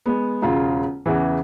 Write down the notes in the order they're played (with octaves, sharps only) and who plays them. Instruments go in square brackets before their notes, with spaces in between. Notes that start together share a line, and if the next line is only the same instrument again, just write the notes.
[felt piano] G#3 B3
E1 C#3 F4
E2 C#3 E3